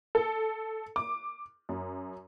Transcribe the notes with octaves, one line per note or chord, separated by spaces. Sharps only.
A4
D6
F#2